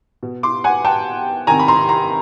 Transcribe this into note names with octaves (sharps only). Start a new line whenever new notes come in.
B2
C6 D6
F#5 G#5
G5 A5
C3 D#3 G#5 A#5
B5
A#5 C6
A#5 C6